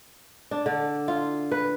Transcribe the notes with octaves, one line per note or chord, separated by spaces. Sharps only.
D4
D3
F4
B4